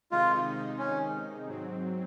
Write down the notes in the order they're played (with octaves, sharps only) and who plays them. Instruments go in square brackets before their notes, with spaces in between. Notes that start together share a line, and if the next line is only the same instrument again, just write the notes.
[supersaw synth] C3 D#3 G#3 D#4 [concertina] F4
[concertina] C#4
[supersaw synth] G#2 F#3 C4